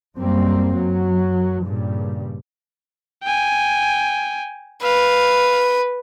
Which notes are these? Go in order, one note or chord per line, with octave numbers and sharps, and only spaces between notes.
F#2 G3 A#3 C4
F#2 F#3
G2 A#2 C#3 G3
G5 G#5
B4 F5